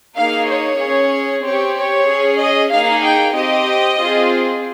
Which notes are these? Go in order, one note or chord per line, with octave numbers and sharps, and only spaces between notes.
A#3 D#4 G#4 F5
C#5
C#4 G#4
C4 G4 C#5
C#5
C#4 G#4
D#5
A#3 D#4 G#4 F5
G5
C4 G4 D#5
C4 F4 G#4